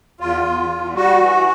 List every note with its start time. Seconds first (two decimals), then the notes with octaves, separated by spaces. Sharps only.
0.20 E2 F4
0.46 E2
0.70 E2
0.95 G3 F#4
1.21 E3